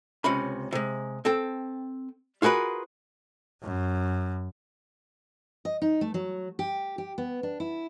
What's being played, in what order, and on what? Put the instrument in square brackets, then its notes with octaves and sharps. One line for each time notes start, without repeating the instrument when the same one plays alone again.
[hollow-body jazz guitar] C#2 C3 C#4 B5
C3 G#3
C4 A4 G5
F4 F#4 G#4 A#4 B4
[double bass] F#2
[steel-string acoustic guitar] D#5
D#4
A3
F#3
G4
G4
B3
D4
E4